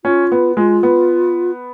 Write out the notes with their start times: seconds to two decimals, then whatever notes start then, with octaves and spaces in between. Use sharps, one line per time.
0.05 C#4 F4
0.32 B3
0.57 G#3 F4
0.83 B3